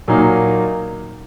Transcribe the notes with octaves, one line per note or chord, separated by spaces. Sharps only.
A#2 F#3 A#3 D#4